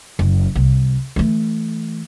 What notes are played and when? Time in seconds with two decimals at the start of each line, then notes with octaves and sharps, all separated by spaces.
0.19 F#1
0.55 C2
1.16 E3 A3